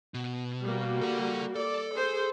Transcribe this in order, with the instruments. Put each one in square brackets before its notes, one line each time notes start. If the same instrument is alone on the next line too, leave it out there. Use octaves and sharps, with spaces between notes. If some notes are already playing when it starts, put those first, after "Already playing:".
[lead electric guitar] B2
[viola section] G3 A#3 F#4
[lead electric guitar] A4 F#5
[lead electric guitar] A4 [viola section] D5
[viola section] G#4 C5